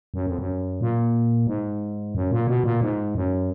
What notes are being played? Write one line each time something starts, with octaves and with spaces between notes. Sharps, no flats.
F#2
F2
F#2
A#2
G#2
F#2
A#2
B2
A#2
G#2
F#2